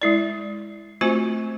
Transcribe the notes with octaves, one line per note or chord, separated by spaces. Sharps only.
G#3 E4 D5
A3 C4 F4 F#4 C5 G#5